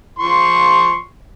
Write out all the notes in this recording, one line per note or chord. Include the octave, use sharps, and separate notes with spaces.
F3 C6 C#6